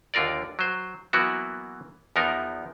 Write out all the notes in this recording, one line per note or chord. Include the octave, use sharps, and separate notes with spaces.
D#2 D3 F4 A#4 D5
F#3 C5
E3 F#3 A#3 B3 E4 F#4
E2 F3 B3 D#4 A#4